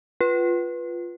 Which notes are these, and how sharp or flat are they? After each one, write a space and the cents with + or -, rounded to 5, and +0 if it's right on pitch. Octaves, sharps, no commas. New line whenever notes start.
F4 +0 B4 -10